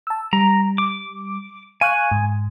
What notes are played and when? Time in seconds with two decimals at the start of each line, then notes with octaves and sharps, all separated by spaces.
0.07 A5 E6
0.33 G3 A#5
0.78 D6
1.81 F5 G#5 C#6 F#6
2.11 G#2